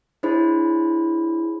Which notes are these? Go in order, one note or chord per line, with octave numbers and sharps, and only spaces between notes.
D4 E4 G#4 C5 C#5 B5